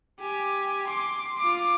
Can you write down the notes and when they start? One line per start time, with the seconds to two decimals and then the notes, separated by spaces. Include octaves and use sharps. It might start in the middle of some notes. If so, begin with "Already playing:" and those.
0.20 G4 G#5
0.87 C6 D6
1.38 F4 D6